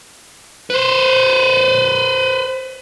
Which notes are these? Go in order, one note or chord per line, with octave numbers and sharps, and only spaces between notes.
B4 C5